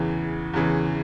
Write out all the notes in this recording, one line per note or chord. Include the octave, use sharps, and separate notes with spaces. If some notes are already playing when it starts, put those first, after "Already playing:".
Already playing: E2 C#3 E3
E2 C#3 E3